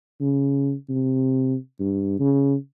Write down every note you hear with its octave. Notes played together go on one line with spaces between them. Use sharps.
C#3
C3
G2
C#3